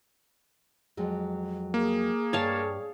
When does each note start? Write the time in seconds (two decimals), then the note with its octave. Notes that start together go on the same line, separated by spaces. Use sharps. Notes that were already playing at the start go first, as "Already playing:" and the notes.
0.97 F2 F#3 G#3
1.74 A#3 G#4
2.33 G2 C#5 F5 A5